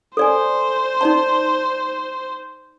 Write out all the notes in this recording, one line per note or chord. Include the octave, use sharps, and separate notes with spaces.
A4 C5 D5 G#5
D#4 D5 A5